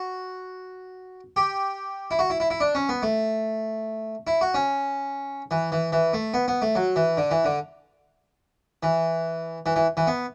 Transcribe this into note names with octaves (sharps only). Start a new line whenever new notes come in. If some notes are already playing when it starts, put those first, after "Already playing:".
Already playing: F#4
G4
E4
F#4
E4
E4
E4
D4
C#4
B3
A3
E4
F#4
C#4
E3
E3
E3
A3
B3
B3
A3
F#3
E3
D3
E3
D3
E3
E3
E3
E3
B3